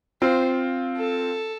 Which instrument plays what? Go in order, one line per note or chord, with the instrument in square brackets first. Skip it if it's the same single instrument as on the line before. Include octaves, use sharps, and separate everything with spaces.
[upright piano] C4 F4 [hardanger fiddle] C5
[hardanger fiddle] A4